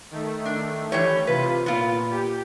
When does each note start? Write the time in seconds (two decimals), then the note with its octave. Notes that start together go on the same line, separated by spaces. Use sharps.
0.11 D#3 A3
0.46 D4
0.92 E3 G3 C#5
1.27 C3 F4 B4
1.66 A#2 B3 F4
2.11 G4